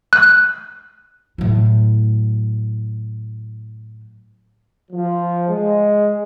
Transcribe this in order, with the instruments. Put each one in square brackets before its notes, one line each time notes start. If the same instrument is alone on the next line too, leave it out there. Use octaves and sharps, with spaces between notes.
[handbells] F#6
[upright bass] A2 F#3
[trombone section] F3
G#3